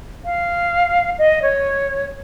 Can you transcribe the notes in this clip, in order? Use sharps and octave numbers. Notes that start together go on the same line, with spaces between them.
F5
D#5
C#5